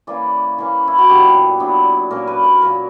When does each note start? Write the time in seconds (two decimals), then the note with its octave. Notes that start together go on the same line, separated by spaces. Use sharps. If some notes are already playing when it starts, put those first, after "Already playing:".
0.07 E3 A#3 C#4 D5
0.58 E3 A#3 C#4
0.88 E4
0.98 F#4
1.09 A#2 F#3 B3 D4 G4
1.60 A#2 F#3 B3 D4
2.10 A#2 A#3 C#4 A#4
2.28 B4
2.44 A#4
2.61 A#2 A#3 C#4 A#4